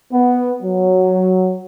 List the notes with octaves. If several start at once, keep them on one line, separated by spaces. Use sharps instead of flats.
B3
F#3